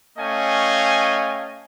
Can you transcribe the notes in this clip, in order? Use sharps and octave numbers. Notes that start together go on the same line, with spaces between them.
A3 C#4 D#5 F5 G5 G#5